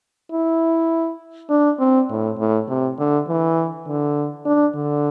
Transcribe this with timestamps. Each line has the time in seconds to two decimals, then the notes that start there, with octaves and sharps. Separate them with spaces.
0.32 E4
1.50 D4
1.79 C4
2.10 A2
2.38 A2
2.69 C3
2.98 D3
3.28 E3
3.87 D3
4.46 D4
4.75 D3